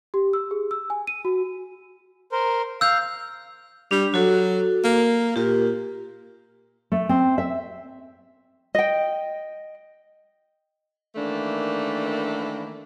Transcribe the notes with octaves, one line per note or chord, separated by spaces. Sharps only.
G4
E6
G#4
E6
G#5
D#7
F#4
A#4 C5
F5 E6 G6
G3 D4
F#3 F#4 A4
A#3
A#2 F4 G4
A3
C4
E5
D#5 G5
D#3 E3 A3 A#3 D4